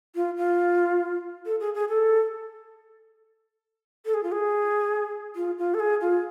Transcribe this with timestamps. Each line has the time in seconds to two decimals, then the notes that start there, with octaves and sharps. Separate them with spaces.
0.15 F4
0.37 F4
1.46 A4
1.60 G#4
1.74 G#4
1.89 A4
4.05 A4
4.14 G#4
4.23 F4
4.32 G#4
5.36 F4
5.58 F4
5.74 A4
5.80 G#4
6.01 F4